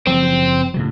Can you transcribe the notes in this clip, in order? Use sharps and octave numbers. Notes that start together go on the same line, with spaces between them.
F#1 F3 F#3 C4
A2 C#3 F#3